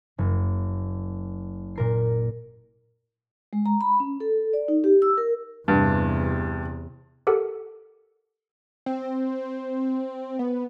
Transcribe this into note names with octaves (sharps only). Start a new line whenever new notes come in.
F#1
A#2 A#4 C7
G#3
A#5
B5
C#4
A4
D5
D#4
G4
E6
A#4
E2 G2 C3
G4 A4 A#4 F#5
C4
B3